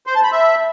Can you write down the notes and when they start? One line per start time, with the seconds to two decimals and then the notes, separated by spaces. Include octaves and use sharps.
0.07 C5
0.15 A5
0.24 B5
0.32 E5